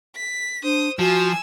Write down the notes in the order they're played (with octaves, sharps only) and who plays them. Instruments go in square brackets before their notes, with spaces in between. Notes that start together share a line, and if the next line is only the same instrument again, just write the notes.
[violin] B6
[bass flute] D4 [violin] C5 D#6
[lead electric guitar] F3 [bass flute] F#4 [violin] G#5 E6